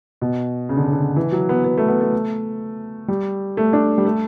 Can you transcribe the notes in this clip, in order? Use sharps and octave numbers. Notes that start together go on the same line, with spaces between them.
B2
C#3
D3
C#3
D3
E3
F#3
B3
B3
A3
B3
A3
G3
A3
D4
G3
A3